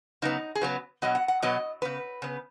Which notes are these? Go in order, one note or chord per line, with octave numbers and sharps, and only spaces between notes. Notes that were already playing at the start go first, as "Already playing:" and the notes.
C#3 F#3 B3 D#4
G#4
C#3 F#3 B3 B4
B2 F#3 B3 D#5
F#5
F#5
B2 F#3 B3 D#5
C#3 B3 B4
C#3 B3